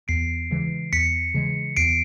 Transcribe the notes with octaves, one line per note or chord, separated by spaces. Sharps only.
E2 C7 D7
C#3 E3 G#3
E2 B6 C#7
C#3 E3 G#3
E2 C7 D7